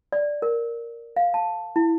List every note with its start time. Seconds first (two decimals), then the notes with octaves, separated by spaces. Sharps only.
0.12 D5
0.42 A#4
1.16 F5
1.34 A5
1.76 E4